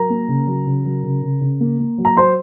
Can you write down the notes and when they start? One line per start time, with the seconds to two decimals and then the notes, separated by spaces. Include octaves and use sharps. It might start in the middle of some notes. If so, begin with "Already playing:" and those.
Already playing: F#3 A#4 A#5
0.10 A#3
0.28 C#3
0.47 F#3
0.66 C#3
0.85 F#3
1.03 C#3
1.22 C#3
1.41 C#3
1.61 A#3
1.79 A#3
1.98 F#3
2.05 A#5
2.16 F#3 C5 C6